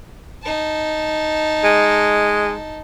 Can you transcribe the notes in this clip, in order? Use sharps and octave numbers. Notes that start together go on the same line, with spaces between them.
D#4 A5
G#3